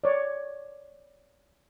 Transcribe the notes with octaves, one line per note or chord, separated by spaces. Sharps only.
C#5 D5